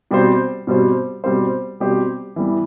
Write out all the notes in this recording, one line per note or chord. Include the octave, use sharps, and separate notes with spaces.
B2 G3 C4 G4 C5
B2 G3 C4 G4 C5
B2 G3 C4 G4 C5
B2 G3 C4 G4 C5
E3 G3 B3